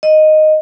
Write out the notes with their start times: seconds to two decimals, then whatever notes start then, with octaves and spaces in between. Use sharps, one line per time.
0.03 D#5